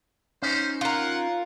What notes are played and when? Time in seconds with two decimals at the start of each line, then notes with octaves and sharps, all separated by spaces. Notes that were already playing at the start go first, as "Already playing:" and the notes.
0.42 C#4 D#4 C5
0.81 F4 A#4 F#5